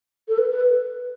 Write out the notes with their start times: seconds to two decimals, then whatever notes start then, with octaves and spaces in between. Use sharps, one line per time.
0.29 A4
0.38 B4
0.51 B4